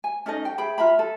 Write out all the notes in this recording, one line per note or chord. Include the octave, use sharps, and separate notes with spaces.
G#5
C#4 D#4 A4 D#5
G5
G#4 E5 G5 B5
F4 E5 A#5 B5
A4